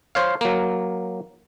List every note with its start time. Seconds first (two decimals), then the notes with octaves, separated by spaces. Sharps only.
0.15 C5 C#5 F5
0.41 F#3 A#3